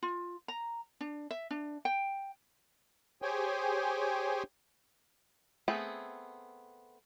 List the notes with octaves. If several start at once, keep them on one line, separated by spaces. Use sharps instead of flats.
F4
A#5
D4
E5
D4
G5
G4 G#4 C5 C#5 G5 G#5
A3 B3 C4 G#4